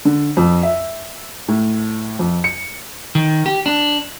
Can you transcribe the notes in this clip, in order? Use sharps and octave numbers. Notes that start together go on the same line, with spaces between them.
D3
F2
E5
A2
F2
C#7
D#3
G4
D4